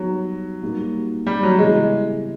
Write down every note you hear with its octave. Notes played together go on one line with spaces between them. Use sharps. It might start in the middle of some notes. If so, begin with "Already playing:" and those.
Already playing: F#3 G3 B3 D#4 F#4
G3 A#3 D#4 F#4
G3
F#3
C#3 E3 G3 G#3 B3 E4